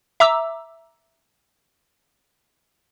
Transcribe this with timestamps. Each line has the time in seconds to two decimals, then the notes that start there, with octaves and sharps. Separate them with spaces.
0.20 E5 A#5 D6 E6